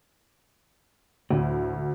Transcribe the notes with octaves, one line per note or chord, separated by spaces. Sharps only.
D2 A2